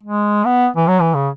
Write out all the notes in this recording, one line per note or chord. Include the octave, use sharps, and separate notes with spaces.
G#3
B3
E3
F#3
E3
C#3